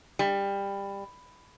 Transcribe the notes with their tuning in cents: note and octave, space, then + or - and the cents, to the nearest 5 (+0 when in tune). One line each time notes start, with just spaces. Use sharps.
G3 +20